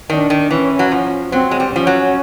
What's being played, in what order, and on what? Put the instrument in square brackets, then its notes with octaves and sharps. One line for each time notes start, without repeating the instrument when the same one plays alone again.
[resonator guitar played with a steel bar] D#3 [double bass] D4
[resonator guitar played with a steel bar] D#3
[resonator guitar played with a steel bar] E3 [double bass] C#4
[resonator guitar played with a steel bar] F#3
F3
[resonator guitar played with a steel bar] F#3 [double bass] C4
[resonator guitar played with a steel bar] G#3
G3
[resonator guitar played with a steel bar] F3 [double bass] C#4
[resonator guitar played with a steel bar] F#3